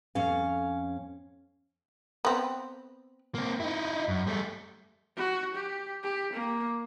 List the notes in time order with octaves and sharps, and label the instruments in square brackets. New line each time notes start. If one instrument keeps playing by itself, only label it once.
[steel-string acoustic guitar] F2 C#4 F5
[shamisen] B3 C4
[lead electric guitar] A#3 C4
D#4 E4
F#2
G3 A3
[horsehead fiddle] F#4
G4
G4
A#3